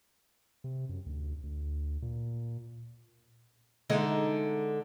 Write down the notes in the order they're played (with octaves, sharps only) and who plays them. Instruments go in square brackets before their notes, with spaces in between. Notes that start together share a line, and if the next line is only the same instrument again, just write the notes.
[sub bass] C3
F#2
D2
D2
A#2
[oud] D3 G#3 D#4